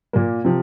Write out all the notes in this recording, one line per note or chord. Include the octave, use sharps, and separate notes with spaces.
A#2 A#3
C3 F3